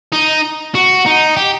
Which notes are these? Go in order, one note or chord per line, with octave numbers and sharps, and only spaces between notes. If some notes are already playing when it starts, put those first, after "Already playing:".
D#4
F#4
D#4
G4